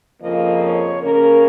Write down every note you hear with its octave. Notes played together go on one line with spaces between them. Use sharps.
F2 C#3 F3 A#3 D#5
C#5
C#3 A#3 C#4 A#4